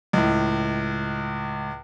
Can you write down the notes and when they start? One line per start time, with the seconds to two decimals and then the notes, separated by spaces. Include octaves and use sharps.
0.13 C#2 A2